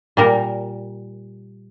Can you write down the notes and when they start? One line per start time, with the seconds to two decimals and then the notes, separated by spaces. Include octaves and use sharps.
0.17 A#2 G3 A#4